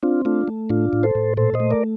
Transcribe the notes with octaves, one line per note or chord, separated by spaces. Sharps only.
C4 D4 F4
A3 D4 F4
A3
A2 D4 F4
A2
A4 C5
A2
A#2 A4 C5
C5 D#5
A3
A#4 D5